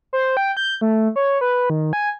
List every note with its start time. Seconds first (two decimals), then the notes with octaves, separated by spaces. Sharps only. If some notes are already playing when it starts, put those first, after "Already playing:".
0.13 C5
0.37 G5
0.57 G6
0.81 A3
1.16 C#5
1.41 B4
1.70 D#3
1.93 G#5